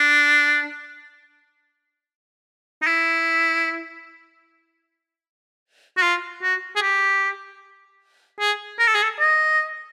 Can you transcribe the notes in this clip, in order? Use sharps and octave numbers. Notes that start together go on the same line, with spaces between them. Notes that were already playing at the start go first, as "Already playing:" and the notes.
Already playing: D4
D#4
E4
F#4
F4
F#4
G#4
G4
G#4
A#4
A4
G#4
A4
D#5